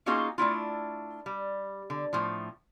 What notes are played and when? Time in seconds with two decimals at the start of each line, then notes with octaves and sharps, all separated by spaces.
0.06 A#3 C#4 D#4 F4 F#4 G#4
0.38 A3 D4 E4 F4
1.26 G3
1.90 D3
2.13 A2 F3